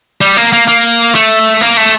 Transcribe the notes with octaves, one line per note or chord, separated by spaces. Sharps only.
G3
A#3
A#3
A#3
A3
A#3
A3